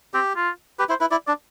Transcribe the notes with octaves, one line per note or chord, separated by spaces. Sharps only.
C4 G4
F4
G4 B4
E4 C5
E4 B4
E4 D5
D4 D5